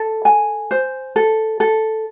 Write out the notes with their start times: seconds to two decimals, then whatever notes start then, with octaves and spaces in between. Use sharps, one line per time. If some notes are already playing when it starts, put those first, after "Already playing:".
Already playing: A4
0.25 G#5
0.71 C5
1.16 A4
1.60 A4